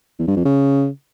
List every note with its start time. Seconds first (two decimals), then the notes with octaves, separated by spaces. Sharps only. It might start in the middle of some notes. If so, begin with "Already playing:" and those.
0.19 E2
0.28 G2
0.36 F2
0.45 C#3